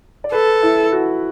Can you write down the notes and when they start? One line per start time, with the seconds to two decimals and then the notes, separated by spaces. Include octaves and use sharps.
0.24 D5
0.32 A4 B4
0.63 E4
0.92 F#4